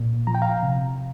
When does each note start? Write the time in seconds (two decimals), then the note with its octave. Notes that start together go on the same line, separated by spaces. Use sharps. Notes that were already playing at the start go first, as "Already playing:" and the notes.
Already playing: A#2
0.27 F3 A#5
0.35 G5
0.42 F5 A#5
0.63 C3